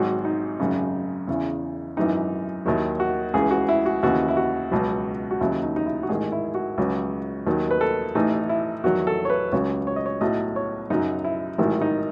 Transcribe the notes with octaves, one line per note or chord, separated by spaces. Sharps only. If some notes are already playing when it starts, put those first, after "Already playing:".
Already playing: G#1 G#2 F#3 F#4
D#4
G#1 F#2 C#3
E2 C#3 E3
G#1 F#2 E3 D#4
D#2 D#3 F#3 E4
F#4
C#2 C#3 E3 G#4
F#4
E4
F#4
D#2 C#3 E3 F#4
E4
F#4
C#2 B2 F#3
F#4
D#2 C#3 F#3 E4
D#4
D#4
E4
F#4
A1 G#2 D#3 G#4
E4
F#4
C#2 C#3 F#3
D#2 D#3 F#3
B4
A4
A1 A2 E3 D#4
E4
E2 D#3 F#3 F#4
A4
C#5
B4
C#2 C#3 F#3 C#5
C#5
D#5
C#5
B1 A2 F#3 D#5
C#5
F#2 C#3 F#3 D#4
E4
A1 G#2 D#3 F#3 E4
D#4